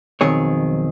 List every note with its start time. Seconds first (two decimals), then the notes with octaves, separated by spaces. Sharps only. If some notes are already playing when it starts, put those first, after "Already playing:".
0.21 B1 F2 D#3 C4 G#4 C#5